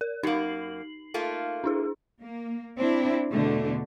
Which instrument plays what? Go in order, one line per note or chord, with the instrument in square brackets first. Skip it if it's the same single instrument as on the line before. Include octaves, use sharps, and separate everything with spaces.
[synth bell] A#4
[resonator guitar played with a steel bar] F#2 A#3 [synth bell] D#4 C7 F#7
[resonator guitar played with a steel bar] A3 A#3 F4
[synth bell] D4 E4 G#4
[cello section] A#3
C4 D4 E4
E2 B2 D3 A3